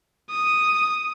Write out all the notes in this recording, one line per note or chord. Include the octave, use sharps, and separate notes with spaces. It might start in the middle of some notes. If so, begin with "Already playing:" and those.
D#6